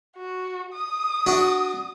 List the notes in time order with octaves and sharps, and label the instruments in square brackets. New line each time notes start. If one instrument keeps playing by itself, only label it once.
[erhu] F#4
D#6
[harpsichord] D4 F#4